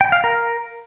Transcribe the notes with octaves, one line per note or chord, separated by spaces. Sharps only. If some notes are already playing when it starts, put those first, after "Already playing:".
G5
F5
A#4